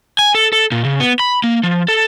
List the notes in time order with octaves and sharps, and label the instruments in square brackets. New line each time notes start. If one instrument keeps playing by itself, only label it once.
[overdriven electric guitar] G#5
A4
A4
A#2
C#3
B3
B5
A#3
F3
A4